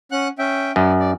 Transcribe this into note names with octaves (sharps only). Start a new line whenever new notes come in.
C#4 F#5 F#6
C#4 E5 G5
F#2 D5
D5